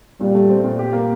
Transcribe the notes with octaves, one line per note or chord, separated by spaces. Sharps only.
A#2 G3
A3
C4
A#2
G4
A#3